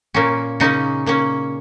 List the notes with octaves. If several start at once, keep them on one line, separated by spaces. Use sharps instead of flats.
A#2 A#3 C#4
C#3 A#3 C#4 D#4
A#2 A#3 C#4